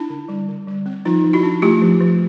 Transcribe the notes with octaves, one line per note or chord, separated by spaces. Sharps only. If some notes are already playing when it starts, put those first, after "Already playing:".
Already playing: D4 E4
D3
G3
D3
G3
C4
F3 D#4 F4
F3
E4 F#4
D4
A3 F4 G4
F3
F3